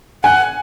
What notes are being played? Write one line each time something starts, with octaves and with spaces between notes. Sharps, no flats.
F#5 G#5